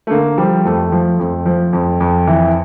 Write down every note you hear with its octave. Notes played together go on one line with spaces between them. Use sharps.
A3
D3 A#3
F3 G3
F2 A3
F3
F2
F3
F2
F2
E3